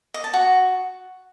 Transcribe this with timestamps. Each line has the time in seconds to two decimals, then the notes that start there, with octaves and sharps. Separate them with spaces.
0.14 D#5
0.24 A5
0.34 F#4